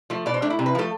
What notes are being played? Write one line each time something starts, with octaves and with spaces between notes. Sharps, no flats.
F3 A3
B2 D5
C5
A3 D4
E4
C3
B4
F3 A3 A4